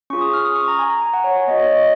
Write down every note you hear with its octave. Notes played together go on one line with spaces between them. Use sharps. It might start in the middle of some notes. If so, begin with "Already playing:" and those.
C#4 F4 G#4 C#6
D#6
F6
D#6
C#6
A#5
G#5
A#5
G#5
F#5
C#5
C#5
B3 F#4 D#5
C#5
D#5